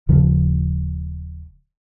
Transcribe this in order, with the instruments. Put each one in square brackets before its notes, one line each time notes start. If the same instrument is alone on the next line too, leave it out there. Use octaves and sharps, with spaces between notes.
[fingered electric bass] D#1 C#3 F3